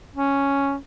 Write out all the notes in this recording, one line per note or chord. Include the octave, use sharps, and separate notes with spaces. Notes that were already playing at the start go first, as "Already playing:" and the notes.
C#4